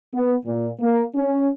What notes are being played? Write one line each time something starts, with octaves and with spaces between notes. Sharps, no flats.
B3
A#2
A#3
C#4